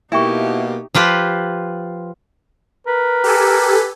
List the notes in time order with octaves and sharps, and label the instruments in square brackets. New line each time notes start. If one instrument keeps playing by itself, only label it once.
[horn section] B2 A#3 [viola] D#4 G4 [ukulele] E4 [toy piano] E5 G5 C#6
[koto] F3 F4 G4 B4
[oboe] A#4 [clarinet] B4
[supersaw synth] G4 A4 G#5